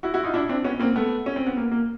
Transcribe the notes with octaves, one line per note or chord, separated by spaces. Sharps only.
E4 F#4
E4 F#4
D#4 F4
D4 E4
C4 D4
B3 C#4
A#3 C4
A3 B3
C#4
C4
B3
A#3
A#3